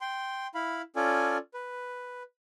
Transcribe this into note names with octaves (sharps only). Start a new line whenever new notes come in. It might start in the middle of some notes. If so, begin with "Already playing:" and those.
G5 C6
E4 F5 B5
C#4 F4 A4 D5 G#5
B4